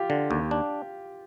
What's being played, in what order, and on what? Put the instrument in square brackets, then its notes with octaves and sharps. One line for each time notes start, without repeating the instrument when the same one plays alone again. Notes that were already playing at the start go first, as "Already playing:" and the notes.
Already playing: [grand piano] F4 G4
[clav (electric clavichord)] D3
D#2
D4